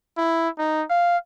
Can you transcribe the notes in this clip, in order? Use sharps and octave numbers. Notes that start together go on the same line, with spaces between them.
E4
D#4
F5